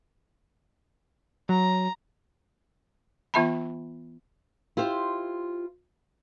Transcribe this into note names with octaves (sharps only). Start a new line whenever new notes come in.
F#3 A#5
E3 B3 F4 E5 A5 B5
E4 F4 G4 C5